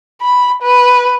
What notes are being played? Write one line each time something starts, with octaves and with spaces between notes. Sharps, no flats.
B5
B4